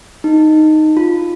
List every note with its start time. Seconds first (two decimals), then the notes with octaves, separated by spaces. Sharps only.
0.24 D#4
0.97 F4